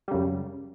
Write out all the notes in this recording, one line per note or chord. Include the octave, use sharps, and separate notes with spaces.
F#2 C#3 G3